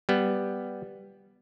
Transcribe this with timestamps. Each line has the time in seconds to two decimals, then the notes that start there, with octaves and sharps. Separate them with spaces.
0.09 G3 B3